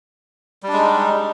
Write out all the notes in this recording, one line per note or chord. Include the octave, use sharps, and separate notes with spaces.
G3 G#3 D4 D#4